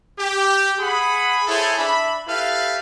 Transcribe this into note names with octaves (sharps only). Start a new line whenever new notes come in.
G4
G#4 F#5 B5
E4 G#4 A4 C5 C#5
D4 E5 B5
E4 G4 A4 B4 F5